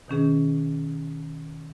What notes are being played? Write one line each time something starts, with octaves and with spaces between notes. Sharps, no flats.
B2 D#3 C#4 G#4